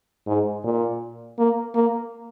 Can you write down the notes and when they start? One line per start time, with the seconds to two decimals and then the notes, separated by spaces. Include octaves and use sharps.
0.27 G#2
0.64 A#2
1.38 A#3
1.75 A#3